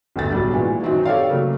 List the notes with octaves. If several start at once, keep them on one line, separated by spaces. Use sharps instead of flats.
G1 D2 A4 A6
B1 F#3 G3 D4
A#2 E3 G#3 F#4
F#2 D#3 F#3 C4 D#4
G4 A4 C#5 D5 F5
C#3 F#3 A3 A#3